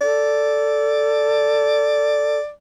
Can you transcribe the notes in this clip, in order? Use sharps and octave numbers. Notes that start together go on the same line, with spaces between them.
A4 D5